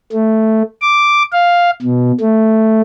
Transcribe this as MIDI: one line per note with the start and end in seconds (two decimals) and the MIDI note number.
0.13 0.63 57
0.81 1.23 86
1.33 1.70 77
1.82 2.12 47
2.21 2.82 57